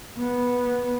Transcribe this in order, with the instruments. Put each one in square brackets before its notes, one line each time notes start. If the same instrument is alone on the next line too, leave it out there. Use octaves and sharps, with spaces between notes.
[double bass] B3